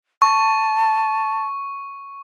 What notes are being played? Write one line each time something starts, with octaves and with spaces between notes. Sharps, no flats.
A5 C#6